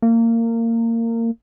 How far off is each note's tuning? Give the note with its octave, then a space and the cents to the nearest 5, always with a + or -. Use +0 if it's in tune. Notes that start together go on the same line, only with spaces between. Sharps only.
A#3 -25